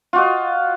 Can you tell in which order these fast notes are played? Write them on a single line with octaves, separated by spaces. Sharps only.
F4 F#4 D#5